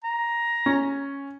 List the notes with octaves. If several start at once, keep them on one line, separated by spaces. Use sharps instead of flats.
A#5
C#4